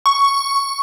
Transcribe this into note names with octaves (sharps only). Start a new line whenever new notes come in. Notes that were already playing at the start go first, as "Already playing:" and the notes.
C#6